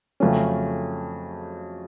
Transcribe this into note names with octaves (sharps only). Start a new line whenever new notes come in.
F2 C#3 F#3 A3 C#4